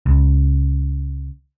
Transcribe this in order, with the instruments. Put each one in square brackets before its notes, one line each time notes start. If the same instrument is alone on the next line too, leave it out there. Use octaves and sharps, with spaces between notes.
[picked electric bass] C#2